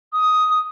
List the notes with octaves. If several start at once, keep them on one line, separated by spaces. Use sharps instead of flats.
D#6